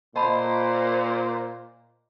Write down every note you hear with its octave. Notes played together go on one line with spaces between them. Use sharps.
A#2 A#3 C5 D#5 A5 B5